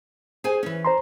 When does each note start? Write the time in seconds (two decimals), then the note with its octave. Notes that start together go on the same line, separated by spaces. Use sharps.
0.44 G#4 C5 G#5
0.63 E3 C#4
0.85 C5 A#5 C6